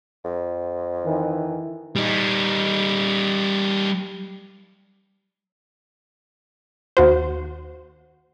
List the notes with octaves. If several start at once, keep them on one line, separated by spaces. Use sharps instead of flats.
F2
D#3 E3
G3 D#4
D#2 F#4 C5